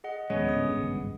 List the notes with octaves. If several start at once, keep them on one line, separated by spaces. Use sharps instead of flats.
G#4 D#5 F#5
A#1 D#2 G#3 B3 C#4 C#5 D#5
A2 D3 D#6
G#1 C#2 G2 G#4